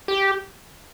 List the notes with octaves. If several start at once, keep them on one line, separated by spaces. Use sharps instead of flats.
G4